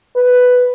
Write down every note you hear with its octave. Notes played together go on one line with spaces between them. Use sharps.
B4